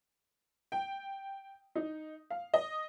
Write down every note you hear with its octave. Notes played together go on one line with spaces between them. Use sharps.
G5
D#4
F5
D#5